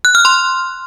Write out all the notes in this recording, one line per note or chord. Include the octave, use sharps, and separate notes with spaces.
F#6
F6
C6